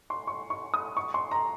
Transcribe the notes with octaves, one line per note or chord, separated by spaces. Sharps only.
C6
C#6
C#6
D#6
C#6
C6
A#5